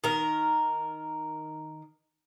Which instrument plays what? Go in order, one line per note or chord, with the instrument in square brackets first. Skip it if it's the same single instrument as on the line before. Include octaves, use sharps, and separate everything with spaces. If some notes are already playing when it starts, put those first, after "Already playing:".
[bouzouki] D#3 A#4